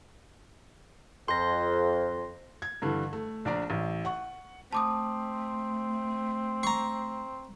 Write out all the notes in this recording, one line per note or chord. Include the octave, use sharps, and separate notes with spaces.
F2 C6 A#6
G#6
G2 D3 E3
A3
A#1 D4 D5 A#5
A1
F#5 C#6
A3 C4 A5 D6 D#6
A#5 C#6 C7